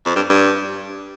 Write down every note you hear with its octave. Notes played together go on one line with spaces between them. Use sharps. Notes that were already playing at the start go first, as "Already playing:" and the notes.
F2
G2
G2